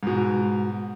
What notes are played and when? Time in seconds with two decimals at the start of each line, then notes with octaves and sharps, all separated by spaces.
0.03 G#2 B2